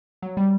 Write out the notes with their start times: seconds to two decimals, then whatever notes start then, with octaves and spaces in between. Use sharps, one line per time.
0.22 F#3
0.37 G3